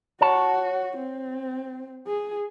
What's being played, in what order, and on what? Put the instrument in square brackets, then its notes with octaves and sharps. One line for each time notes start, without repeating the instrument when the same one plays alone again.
[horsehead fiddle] F#4 [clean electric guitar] C#5 A5
[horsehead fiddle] C4
G#4